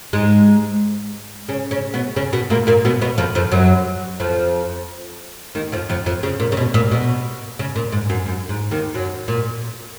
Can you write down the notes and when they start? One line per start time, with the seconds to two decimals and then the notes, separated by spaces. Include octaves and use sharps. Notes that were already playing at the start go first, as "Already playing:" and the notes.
0.13 G#2 G#3
1.49 C#3 C#4
1.71 C#3 C#4
1.94 B2 B3
2.16 C#3 C#4
2.33 B2 B3
2.50 A#2 A#3
2.67 A#2 A#3
2.85 B2 B3
3.02 B2 B3
3.18 F2 F3
3.35 F2 F3
3.51 F#2 F#3
4.20 F2 F3
5.55 D#2 D#3
5.72 F2 F3
5.90 F2 F3
6.06 F2 F3
6.23 C#3
6.40 A#2
6.52 C#3
6.57 B2
6.74 A#2
6.92 B2
7.59 C#3
7.76 A#2
7.92 G#2
8.10 F#2
8.26 F#2
8.49 G#2
8.71 D#2 D#3
8.94 F#2 F#3
9.28 A#2